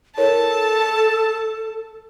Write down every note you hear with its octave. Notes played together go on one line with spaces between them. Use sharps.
E4 A4 A#4 C#5 A5